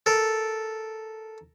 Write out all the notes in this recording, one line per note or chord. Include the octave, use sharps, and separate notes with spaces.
A4 A#4